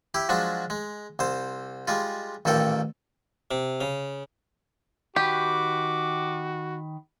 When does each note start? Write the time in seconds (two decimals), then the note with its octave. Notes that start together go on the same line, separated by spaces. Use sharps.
0.14 E4 G4
0.29 F3 F#3 G#3 D4
0.70 G#3
1.19 C2 C5
1.88 G3 G#3 F4
2.45 A1 A#2 D#3 A4 G5
3.51 C3
3.81 C#3
5.16 D#3 F#4 G4 B4 D6